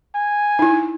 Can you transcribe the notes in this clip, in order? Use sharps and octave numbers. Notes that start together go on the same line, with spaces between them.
G#5
D#4 E4